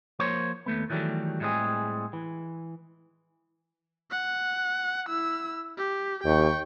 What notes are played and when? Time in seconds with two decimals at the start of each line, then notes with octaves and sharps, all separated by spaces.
0.19 F3 A#3 C5 C#5
0.66 D#2 A3 B3
0.90 D#3 E3 F#3 G3 A3
1.40 A2 G3 G#3 C4 G#4
2.13 E3
4.11 F#5
5.09 E4 E6
5.78 G4
6.24 D#2 G5 C#6